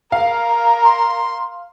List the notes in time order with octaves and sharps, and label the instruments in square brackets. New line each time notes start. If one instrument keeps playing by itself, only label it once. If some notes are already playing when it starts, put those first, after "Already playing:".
[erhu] A#4 [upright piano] F5
[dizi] C6